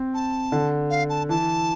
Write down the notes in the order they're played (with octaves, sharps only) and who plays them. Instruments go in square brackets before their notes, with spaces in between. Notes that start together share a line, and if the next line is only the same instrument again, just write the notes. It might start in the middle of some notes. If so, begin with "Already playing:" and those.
Already playing: [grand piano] C4
[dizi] A5
[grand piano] D3
[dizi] F5
A5
[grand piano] E3 [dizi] A5